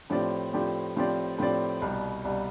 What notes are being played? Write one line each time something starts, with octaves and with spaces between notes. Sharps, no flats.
A2 F3 C4 G4 D5
A2 F3 C4 G4 D5
A2 F3 C4 G4 D5
A2 F3 C4 G4 D5
C2 B2 G3
C2 B2 G3